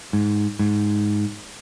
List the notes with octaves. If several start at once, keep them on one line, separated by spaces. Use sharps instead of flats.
G#2
G#2